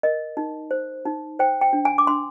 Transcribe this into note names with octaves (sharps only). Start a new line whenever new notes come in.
A#4 D#5
D#4
C5
D#4
C5 G5
G5
D4
G#5
D6
D4 C6